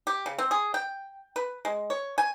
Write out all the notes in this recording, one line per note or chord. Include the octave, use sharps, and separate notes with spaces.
G4
C#3
C4
G#4
G5
B4
G#3
C#5
G#5